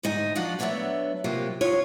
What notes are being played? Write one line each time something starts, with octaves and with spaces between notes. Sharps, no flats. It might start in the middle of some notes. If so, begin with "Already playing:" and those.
D2 G#2 D#4 G#5
F3 F#3 D4 F4 F#4
F#3 A3 B3 D4 C#5 E5
C3 F#3 A#3 F4 G4
C#4 F4 C#5